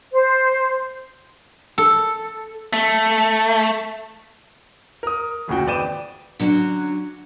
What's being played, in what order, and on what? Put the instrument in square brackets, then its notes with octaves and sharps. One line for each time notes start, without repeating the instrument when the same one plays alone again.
[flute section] C5
[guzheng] A4
[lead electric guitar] A3
[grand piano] A#4 D#6
F#1 D2 A#2 C#3 F#4 G5
G#1 B4 D5 G5 D#7 E7
[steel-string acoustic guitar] D3 F#3 C#4 F#4